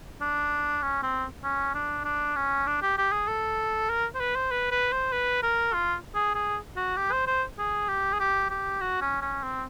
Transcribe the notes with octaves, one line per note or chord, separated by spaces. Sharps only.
D4
C#4
C4
C#4
D4
D4
C#4
D4
G4
G4
G#4
A4
A#4
C5
B4
C5
B4
B4
C5
B4
A#4
F4
G#4
G#4
F#4
G4
C5
C5
G#4
G4
G#4
G4
G4
F#4
C#4
C#4
C4